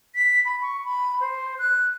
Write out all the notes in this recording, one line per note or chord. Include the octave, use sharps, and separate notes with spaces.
B6
B5
C#6
B5
C5
F#6